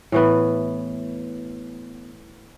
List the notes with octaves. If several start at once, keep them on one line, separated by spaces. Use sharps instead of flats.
A2 E3 B3